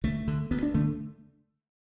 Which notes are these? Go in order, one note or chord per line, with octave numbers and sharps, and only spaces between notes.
D2 A3
D3
D2 B3
D4
D3 A3